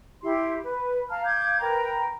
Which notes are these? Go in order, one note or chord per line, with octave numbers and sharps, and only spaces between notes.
E4 G4 C6
B4
F5 A5 A#5 F6
F5 D6 G6 G#6
A#4 B4 G5 A#5